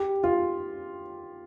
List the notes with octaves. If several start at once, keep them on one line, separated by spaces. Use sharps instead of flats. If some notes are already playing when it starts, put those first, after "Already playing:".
Already playing: G4
F4